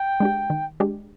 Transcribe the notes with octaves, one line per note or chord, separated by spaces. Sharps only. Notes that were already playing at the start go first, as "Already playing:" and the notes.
Already playing: G5
G#3 D4 G4
D#3
G#3 D4 G4